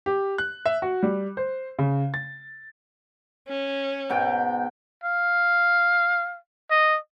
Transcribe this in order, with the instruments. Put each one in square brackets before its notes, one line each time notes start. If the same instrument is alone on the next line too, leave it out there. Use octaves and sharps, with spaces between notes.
[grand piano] G4
F#6
E5
F#4
G3
C5
C#3
A6
[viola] C#4
[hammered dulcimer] G#2 B2 G5
[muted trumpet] F5
D#5